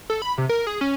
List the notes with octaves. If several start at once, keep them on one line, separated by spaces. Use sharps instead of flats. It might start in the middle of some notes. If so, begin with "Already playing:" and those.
A4
B5
C3
A#4
G#4
C#4